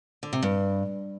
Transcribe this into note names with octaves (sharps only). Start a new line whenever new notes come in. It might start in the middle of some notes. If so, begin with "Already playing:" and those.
D3
C3
G2